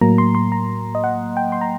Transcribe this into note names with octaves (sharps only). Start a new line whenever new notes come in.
A2 F#3 A#3 A#5
C6
C6
A#5
D#5
F#5
G5
C6
A#5